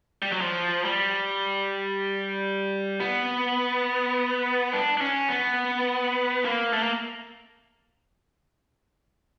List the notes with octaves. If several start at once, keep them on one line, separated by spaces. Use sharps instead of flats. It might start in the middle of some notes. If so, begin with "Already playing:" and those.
G3
F#3
F3
G3
B3
D4
D4
C#4
B3
A#3
A3
A#3